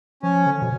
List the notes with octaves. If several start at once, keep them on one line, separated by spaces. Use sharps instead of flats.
F3 C#4
D3
B2